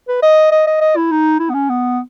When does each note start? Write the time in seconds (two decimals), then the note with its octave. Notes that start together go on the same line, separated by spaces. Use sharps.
0.09 B4
0.23 D#5
0.52 D#5
0.67 D#5
0.81 D#5
0.96 E4
1.11 D#4
1.40 E4
1.50 B3
1.54 C#4
1.69 B3